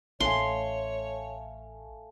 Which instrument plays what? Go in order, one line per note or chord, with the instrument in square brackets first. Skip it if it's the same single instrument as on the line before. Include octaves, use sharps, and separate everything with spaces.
[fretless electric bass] A1 [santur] A3 F5 G#5 [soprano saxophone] C#5 [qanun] C6